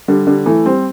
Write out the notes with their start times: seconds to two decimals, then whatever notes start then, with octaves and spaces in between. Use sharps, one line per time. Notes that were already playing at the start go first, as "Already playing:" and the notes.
0.08 D3 G3
0.27 D3 G3
0.46 E3 A3
0.65 G3 C4